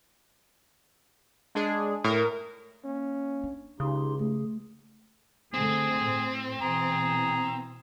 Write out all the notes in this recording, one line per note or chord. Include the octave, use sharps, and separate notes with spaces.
G#3 D4 G#4
A2 A#4
A#3 C#4
D4
C#2 C#3 D#4 G4 C6
A3 G#4
D3 A3 C4 G#4
A2
B2 E3 G#4 A#5